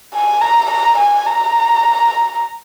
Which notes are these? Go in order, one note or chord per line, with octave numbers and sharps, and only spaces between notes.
G#5
A#5
A#5
G#5
A#5